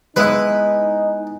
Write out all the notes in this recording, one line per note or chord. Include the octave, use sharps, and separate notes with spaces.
G#3 B3 D#4 E4 B4